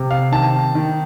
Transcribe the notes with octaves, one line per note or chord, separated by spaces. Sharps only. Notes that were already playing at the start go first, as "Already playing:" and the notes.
Already playing: C3
F5
D#3 A5
D#3